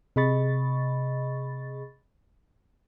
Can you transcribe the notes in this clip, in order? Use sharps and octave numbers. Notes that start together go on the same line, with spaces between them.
C3 G#4 D#5 B5 C#6 A6